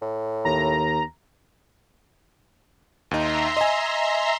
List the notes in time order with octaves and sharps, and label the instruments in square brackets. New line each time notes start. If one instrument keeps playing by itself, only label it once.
[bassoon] A2
[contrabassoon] D#2 [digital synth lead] A#5
[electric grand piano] D#2 D#4 [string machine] E5 A#5 C6
[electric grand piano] D#5 G#5